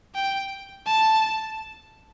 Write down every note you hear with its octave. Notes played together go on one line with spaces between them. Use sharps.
G5
A5